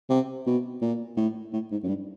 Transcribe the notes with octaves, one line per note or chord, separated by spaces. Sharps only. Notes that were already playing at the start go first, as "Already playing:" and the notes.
C3
B2
A#2
A2
A2
G#2
F#2
G2